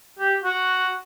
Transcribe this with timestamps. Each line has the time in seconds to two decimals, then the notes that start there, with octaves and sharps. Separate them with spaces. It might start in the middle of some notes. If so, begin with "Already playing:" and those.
0.19 G4
0.44 F#4